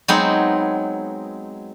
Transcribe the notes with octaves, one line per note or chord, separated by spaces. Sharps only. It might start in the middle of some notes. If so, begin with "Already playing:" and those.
F#3 G#3 B3 C4 D#4